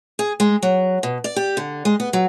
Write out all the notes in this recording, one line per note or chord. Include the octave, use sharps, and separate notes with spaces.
G#4
G#3
F#3
B2
D5
G4
D3
G#3
B3
F#3